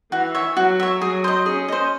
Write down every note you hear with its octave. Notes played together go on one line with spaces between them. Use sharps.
E3 F#4
C#5 E5
F#3 F#4
C#5 E5
F#3 G#4
C5 D#5
C#4 G#4
C5 D#5